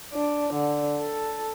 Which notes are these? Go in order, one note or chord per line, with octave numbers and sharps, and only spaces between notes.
D4
D3
A4